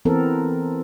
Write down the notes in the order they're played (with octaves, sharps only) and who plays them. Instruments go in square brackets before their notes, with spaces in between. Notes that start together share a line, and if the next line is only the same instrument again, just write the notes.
[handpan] E3 B3 C4 A4 A#4